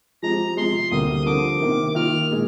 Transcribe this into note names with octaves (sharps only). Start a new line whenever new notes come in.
F3 G#3 C4 G4 A#5
C3 F3 G#3 C6
D2 C3 G3 A#3 D#6
D3 F3 C4 F4 A#4 D6
C3 D#3 A#3
D#3 A#3 F4 F6
A#2 G#3